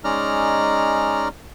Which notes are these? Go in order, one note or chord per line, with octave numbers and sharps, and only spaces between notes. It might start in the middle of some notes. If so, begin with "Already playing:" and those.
G#3 C#4 D#4 D5 A#5 F6